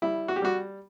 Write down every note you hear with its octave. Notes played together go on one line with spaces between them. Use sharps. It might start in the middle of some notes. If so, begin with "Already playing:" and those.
G3 E4
F#4
G4
G3 F#4